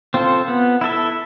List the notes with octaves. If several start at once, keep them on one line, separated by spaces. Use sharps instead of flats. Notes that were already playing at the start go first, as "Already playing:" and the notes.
C4 F4 A4
B3
E4 A4 E5